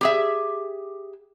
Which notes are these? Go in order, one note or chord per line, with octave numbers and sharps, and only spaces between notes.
G4 G#4 E5